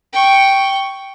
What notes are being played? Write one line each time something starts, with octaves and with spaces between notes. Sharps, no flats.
G5 C#6